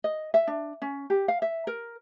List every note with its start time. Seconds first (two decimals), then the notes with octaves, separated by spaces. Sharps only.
0.04 D#5
0.34 E5
0.47 D4
0.82 C#4
1.10 G4
1.28 F5
1.42 E5
1.67 A#4